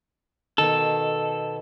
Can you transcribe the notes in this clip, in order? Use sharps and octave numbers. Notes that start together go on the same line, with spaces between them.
B2 D#3 A4